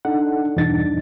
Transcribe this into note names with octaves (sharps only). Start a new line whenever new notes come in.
D4 D#4 A4 F#5
E2 G2 B2 D4 D#4 A6